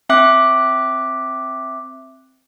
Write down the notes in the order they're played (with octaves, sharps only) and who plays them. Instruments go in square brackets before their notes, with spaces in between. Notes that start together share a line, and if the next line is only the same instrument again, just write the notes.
[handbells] C4 E5 D6 F#6